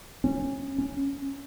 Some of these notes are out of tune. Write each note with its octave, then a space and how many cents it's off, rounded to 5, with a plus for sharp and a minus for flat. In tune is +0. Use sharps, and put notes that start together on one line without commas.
C#4 -20
C#4 +0